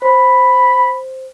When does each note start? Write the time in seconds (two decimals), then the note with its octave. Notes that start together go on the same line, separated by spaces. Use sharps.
0.02 C5 B5